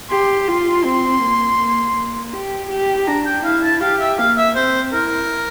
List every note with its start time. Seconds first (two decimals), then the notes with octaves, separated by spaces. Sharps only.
0.11 G4 C6
0.48 F4
0.85 C4
1.22 A#3
1.58 A#3
1.96 A#3
2.33 G4
2.70 G4
3.07 D4 A#5
3.26 G5
3.44 E4 F5
3.63 A5
3.81 G4 F5
4.00 E5
4.18 A#3 F5
4.37 E5
4.56 C4 C5
4.92 E4 A#4